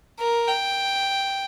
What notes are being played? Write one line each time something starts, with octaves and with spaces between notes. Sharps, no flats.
A#4
G5